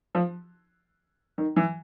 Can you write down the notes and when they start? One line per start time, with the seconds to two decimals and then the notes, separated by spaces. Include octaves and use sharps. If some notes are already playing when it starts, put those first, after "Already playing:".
0.15 F3
1.38 D#3
1.56 E3